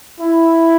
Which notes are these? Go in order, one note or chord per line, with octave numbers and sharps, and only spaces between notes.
E4